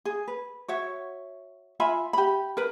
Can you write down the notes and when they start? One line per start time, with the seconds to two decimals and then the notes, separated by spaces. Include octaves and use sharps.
0.05 G#4
0.28 B4
0.68 F#4 C#5 E5
1.80 F4 E5 G#5 B5
2.13 G4 B5
2.57 A#4 B4